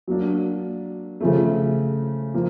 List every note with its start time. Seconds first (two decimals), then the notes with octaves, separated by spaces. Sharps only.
0.07 F#3 A#3 D4
1.21 C#3 F3 A3
2.34 F3 A#3